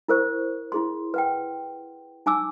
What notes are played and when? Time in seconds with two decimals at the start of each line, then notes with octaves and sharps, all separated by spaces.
0.08 E4 A#4 C5 C#6
0.72 E4 G#4 C6
1.14 B4 F#5 G5
2.26 D#4 G#5 D6 E6